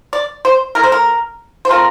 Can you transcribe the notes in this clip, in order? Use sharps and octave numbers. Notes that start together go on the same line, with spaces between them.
D5
C5
E3 A3 E4 A#4
C5
A#4
C5
F3 A3 C4 F4 A#4